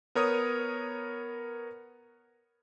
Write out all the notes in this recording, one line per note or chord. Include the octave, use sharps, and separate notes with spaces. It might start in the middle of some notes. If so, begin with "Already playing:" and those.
B3 A#4 C#5 D#6